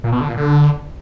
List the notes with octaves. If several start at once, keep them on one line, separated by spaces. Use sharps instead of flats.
A#2
B2
D3
A#2
D3